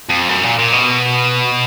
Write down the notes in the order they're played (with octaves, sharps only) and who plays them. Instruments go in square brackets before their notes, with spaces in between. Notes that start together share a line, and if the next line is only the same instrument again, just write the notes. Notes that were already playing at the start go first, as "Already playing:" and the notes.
[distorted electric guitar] F2
F#2
A#2
A#2
B2